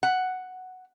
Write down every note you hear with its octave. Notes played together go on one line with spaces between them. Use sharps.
F#5